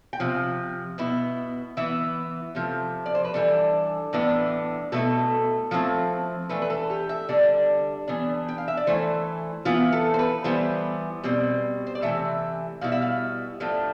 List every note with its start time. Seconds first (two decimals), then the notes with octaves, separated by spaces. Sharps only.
0.13 G5
0.20 C3 F3
0.98 B2 B3 E4
1.77 E3 B3 E4 E5
2.55 C3 F3 A3
3.06 D5
3.15 C5
3.24 B4
3.34 E3 G3 D4 A4
4.13 A2 E3 B3 D4
4.92 B2 A3 E4 A4
5.71 F3 A3 C4 E4
6.49 E3 A3 D4 B4
6.62 B4
6.70 A4
6.90 G4
7.09 E5
7.29 D3 G3 D4 D5
8.08 E3 B3 D4
8.48 G5
8.58 F5
8.68 E5
8.77 D5
8.87 E3 A3 E4 C5
9.65 E3 B3 E4 F4
9.92 A4
10.14 C5
10.19 B4
10.44 E3 G3 B3 E4 C5
11.23 B2 G3 C4
11.87 C5
11.95 D5
12.02 C3 E3 A3 E5
12.81 B2 G3 B3 E4 F5
12.92 E5
13.02 F5
13.60 A2 F3 A3 D4